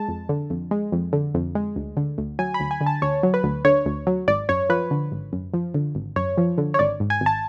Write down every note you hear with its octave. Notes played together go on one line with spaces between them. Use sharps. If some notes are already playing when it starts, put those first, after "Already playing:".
Already playing: G#3 A5
F2
D3
F2
G#3
F2
D3
F2
G#3
D2
D3
D2
F#3 G#5
B5
D2
G#5
D3
A5
D2 C#5
F#3
B4
D2
D3 C#5
D2
F#3
G#1 D5
F#2 C#5
F3 B4
D3
G#1
F#2
F3
D3
G#1
F#2 C#5
F3
D3
C#5
G#1 D5
G#2
G#5
G#1
A5